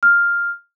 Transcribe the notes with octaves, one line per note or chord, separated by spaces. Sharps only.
F6